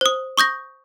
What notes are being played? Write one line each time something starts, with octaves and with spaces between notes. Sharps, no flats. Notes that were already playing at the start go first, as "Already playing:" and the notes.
C5 D#6
C#6 D#6 G6 A#6